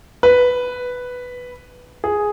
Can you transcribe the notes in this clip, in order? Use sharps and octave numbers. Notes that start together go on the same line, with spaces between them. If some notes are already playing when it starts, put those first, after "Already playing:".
B4
G#4